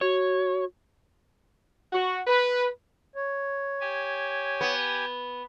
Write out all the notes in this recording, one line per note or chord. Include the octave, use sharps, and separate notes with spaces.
F#4 C#5
F#4
B4
C#5
G4 G#5
B3